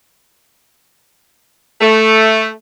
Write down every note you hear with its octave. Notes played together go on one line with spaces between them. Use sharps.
A3